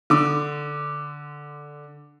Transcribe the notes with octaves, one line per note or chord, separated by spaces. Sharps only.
D3 D6